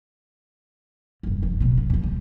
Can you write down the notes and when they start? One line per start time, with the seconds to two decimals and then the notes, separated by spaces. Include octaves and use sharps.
1.23 F1 G2
1.43 F2
1.60 D1 B2
1.77 A#1
1.90 D#2 E3
2.03 G3